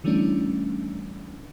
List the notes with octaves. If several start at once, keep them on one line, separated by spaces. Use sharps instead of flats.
D3 E3 G3 A3 C#4 D4